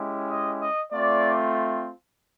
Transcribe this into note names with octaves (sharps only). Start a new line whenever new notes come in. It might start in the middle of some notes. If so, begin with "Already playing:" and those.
Already playing: G#3 C#4 E4 G4
D#5
D#5
A3 C4 F4 D5